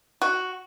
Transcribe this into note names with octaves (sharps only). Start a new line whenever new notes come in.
F#4